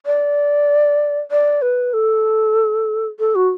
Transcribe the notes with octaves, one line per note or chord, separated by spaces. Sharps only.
D5
D5
B4
A4
A4
F#4